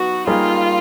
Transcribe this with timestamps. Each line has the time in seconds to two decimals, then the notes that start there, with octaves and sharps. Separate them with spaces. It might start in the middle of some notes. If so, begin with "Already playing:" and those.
Already playing: F#3 B3 D#4 F#4
0.27 G3 A#3 D#4 F4 G#4